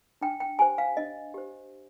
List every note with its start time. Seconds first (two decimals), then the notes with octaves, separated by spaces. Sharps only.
0.21 D4 G5
0.40 G5
0.59 G4 C5 G#5
0.78 F5
0.97 D4 D#5
1.34 G4 C5